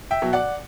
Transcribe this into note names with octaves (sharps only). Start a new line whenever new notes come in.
E5 G5
B2 F#3
D5 F#5